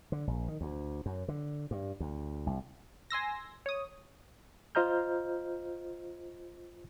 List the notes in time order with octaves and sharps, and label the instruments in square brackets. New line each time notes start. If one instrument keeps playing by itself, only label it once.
[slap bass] D3
A#1
D#3
D2
F#2
D3
G2
D2
C2
[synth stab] G#5 C6 E6 A#6
C#5 D#6
[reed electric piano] F4 C5 D#5 A#5 F6 G6